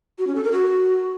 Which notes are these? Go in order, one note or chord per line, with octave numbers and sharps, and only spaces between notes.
F#4
C#4
A4
A#4
F#4